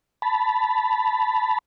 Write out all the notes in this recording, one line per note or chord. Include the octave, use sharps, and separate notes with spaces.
A5 B5